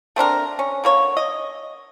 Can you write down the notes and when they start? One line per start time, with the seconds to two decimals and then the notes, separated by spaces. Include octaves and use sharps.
0.16 A3 C4 D4 A#4
0.59 C#4
0.84 D3 A#3 C#5
1.17 D#5